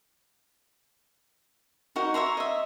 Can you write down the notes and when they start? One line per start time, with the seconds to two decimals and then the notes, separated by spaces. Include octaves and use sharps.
1.96 D#4 F#4 A#4 F#5
2.14 C#5 E5 A#5 C6
2.37 D#5 E5